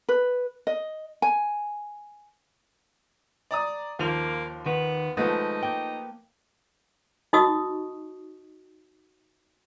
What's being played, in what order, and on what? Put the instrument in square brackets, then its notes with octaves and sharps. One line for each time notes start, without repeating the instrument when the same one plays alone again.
[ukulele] B4
D#5
G#5
[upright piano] D5 A#5 D#6
[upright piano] D#2 F7 [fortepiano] F3 [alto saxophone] A#3
[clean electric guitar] D#3 [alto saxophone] B3
[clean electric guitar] G#2 [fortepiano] F3 A3 B3 [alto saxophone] D#4
[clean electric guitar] A#3 G5
[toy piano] D#4 F#4 D#5 C#6 D#6 E6